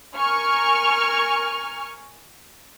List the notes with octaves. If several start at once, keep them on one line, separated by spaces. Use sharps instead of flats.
A#4 G#5 C#6 F6